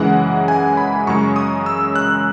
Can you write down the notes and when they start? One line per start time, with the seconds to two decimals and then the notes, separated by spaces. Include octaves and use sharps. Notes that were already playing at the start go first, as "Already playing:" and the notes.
Already playing: F#2 C#3 E3 G#3 F#5
0.48 G#5
0.77 B5
1.07 F#2 C#3 G#3 C#6
1.36 D#6
1.66 E6
1.95 F#6